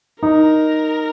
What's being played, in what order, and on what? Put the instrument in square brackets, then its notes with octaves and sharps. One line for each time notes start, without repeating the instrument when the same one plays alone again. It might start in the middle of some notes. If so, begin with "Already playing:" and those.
[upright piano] D#4 [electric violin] A#4